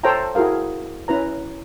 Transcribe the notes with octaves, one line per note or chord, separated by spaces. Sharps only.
A4 C5 C#5 E5 G5 A#5
E4 F#4 G#4 A#4 F5
C#4 E4 B4 A#5